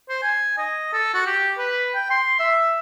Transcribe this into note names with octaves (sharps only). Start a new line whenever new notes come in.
C5
G#5
D#5
A4
F#4
G4
B4
G5
C6
E5